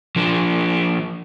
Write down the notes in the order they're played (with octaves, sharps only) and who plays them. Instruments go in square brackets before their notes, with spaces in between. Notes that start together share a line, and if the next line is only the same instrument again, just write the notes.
[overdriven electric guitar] F3 D4